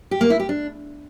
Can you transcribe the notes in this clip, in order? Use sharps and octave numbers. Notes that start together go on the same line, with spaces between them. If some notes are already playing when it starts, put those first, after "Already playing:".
G4
A#3
E4
G4
D4